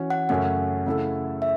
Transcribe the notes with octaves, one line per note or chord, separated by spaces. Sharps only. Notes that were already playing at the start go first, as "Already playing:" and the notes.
Already playing: E3 C#4 F#4 C#5
F#5
F#2 C#3 A3 C#4 F#5
C#3 A3 E4 A4
E5